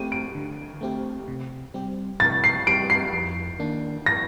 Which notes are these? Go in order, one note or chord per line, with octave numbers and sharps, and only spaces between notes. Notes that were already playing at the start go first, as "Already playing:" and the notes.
Already playing: A3 C4 G4 D#7
D7
D3
A3 C4 G4
C3
G3 C4 G4
C3 A6
C7
G3 C4 G4 D7
C7
F2
D#3 A#3 D4
A#6